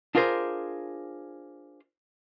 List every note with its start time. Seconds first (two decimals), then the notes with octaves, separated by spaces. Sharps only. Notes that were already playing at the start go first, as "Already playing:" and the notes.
0.15 D4 F4 G#4 A#4 C5